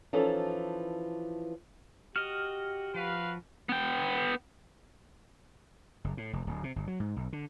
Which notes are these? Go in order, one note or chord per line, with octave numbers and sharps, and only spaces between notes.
E3 F3 C#4 D#4 A4
F#4 G4 D#5 F6
F3 F#4 B4 F5
B3 G5
F#1
A2
F1
D1
C3
G1
F#3
G#2
B1
D3